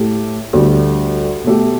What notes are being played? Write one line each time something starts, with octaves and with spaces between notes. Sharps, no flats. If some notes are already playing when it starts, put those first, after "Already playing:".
Already playing: A2 A3 G4
D2 D3 G3
B2 A3 G4